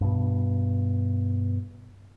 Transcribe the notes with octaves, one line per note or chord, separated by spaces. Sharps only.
G2 B2